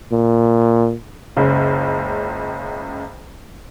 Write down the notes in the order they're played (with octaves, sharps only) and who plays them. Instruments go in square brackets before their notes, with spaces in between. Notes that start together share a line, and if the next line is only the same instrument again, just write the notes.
[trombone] A#2
[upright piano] F#1 C#2 C#3